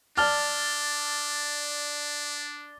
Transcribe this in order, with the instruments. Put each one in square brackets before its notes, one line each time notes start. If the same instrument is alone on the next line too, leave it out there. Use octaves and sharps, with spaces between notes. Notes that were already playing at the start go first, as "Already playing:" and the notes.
[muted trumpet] D4 [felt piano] D5 A5 F6 [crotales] D6 A6 G7